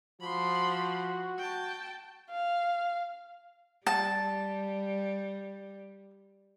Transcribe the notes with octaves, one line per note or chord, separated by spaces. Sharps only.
F3 F#4 B5 C6
G5 A5
F5
G3 A5